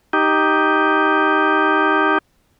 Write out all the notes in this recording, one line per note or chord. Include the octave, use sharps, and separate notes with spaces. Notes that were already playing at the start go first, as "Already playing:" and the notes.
D#4 G4